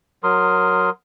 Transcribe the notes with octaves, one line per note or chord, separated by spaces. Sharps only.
F#3 A#4 C6 D#6